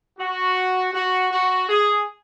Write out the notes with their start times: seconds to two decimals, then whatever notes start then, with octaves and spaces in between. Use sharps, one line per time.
0.19 F#4
0.93 F#4
1.31 F#4
1.68 G#4